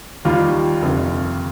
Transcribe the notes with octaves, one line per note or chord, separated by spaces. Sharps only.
D#2 D#3 G3 F4
F1 D#2 D3